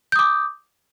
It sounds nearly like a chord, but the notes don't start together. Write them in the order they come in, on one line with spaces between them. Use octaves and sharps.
G6 D#6 D6